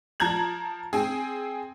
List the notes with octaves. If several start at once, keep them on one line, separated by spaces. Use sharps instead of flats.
F3 A5 A#5 G#6 F#7
C4 G#4